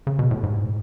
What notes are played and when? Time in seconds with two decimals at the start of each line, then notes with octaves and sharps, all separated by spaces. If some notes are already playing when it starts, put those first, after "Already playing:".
0.07 C#3
0.19 B2
0.31 A2
0.43 G#2